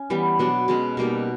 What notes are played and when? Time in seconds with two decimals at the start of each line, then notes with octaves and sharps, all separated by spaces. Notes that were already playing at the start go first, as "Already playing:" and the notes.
Already playing: C#4
0.10 E3 G3 B3
0.39 B2 F#3 B3 D4
0.68 B2 G#3 C#4
0.97 B2 G3 A#3 D#4